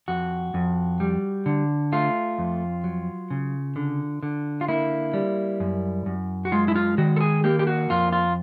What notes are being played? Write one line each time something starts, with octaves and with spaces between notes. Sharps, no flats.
F2 F#4
F2
G3
D3
A3 F4
F2
F#3
C#3
D3
D3
F4
A#3 E4
G3
F#2
F#2
F#4
G#3 F4
E4
F4
D#3 F#4
A4
G#4
A#3 G4
G4
F#4
F2 F4
F4